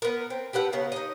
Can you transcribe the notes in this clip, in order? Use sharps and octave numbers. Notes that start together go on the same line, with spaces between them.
B3 A#4
C4
G4 A4 B4 F#5
C#3 B3 F5 A#5
D#4 D#5